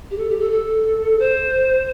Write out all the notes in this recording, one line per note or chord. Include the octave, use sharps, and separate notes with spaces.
G4
A4
G4
A4
A4
C5